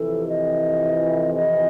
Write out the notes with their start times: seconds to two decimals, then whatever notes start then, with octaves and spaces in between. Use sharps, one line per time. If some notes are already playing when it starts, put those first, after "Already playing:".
Already playing: F2 C3 E3 A4
0.28 D#5
1.35 D#5